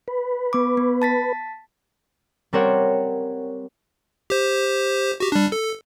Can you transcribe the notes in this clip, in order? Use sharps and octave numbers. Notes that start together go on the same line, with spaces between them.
B4
B3 D6
B3
A5 A6 B6
G3 C4 A#4 C5 C#5 F#5
G4 C5
F#4 G4
G3 D4
A4